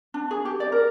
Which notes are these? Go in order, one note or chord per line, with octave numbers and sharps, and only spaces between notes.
D4
G#4
G4
D5
A#4